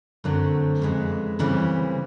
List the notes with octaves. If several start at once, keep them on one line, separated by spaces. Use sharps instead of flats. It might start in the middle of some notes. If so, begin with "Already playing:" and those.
F#2 D3 F#3 A3 C4
F2 C#3 E3 G#3
D2 C#3 E3 G3 C4